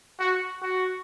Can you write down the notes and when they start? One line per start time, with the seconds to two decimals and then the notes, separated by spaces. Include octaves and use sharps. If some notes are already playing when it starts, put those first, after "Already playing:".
0.19 F#4
0.62 F#4